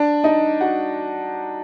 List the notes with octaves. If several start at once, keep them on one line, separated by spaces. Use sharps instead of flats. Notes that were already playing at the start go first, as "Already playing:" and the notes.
Already playing: D4 D5
D#4 D#5
F#4 F#5